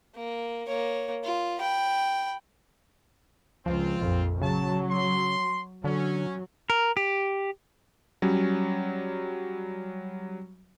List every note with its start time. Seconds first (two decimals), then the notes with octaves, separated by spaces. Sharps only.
0.15 A#3
0.67 A#3 C#5
1.24 F4
1.59 G5 B5
3.66 C#2 F3 C4 F4
4.01 A#1 F2
4.42 C#3 F#3 A5
4.90 C6
5.84 D3 F#3 C#4
6.70 A#4
6.97 G4
8.22 F#3 G3 C#4